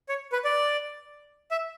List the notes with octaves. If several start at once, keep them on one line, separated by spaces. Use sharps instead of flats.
C#5
B4
D5
E5